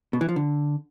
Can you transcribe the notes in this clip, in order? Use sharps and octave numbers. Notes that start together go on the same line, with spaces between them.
B2
E3
F3
D3